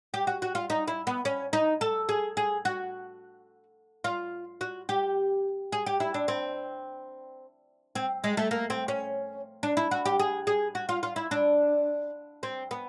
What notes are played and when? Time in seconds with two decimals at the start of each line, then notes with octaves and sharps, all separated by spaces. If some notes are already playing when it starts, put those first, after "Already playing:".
0.14 G4
0.27 F#4
0.42 F#4
0.55 F4
0.70 D#4
0.88 E4
1.07 B3
1.25 C#4
1.53 D#4
1.81 A4
2.09 G#4
2.37 G#4
2.65 F#4
4.04 F4
4.61 F#4
4.89 G4
5.72 G#4
5.86 G4
6.00 E4
6.14 D4
6.28 C4
7.95 C4
8.24 G#3
8.37 A3
8.51 A#3
8.70 C4
8.88 C#4
9.63 D4
9.77 E4
9.91 F#4
10.06 G4
10.19 G#4
10.47 G#4
10.75 F#4
10.89 F4
11.03 F4
11.16 E4
11.31 D4
12.43 C4
12.71 B3